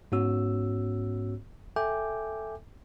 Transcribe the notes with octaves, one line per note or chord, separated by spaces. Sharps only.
G#2 B3 C#4 F#4 C#5 E6
A4 E5 G5 G#5 D6 G6